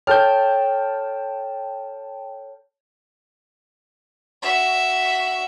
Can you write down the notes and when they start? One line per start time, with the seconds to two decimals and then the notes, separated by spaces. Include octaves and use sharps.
0.07 A4 C#5 G5 A5 F6 G6
4.43 F#4 E5